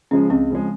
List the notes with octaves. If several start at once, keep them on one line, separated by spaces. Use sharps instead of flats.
C#3 F3 G#3 C#4
C#2 C4
C#3 F3 G#3